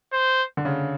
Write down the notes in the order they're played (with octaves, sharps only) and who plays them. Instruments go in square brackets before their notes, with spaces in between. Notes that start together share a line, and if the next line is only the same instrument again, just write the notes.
[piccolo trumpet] C5
[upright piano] D3
C#3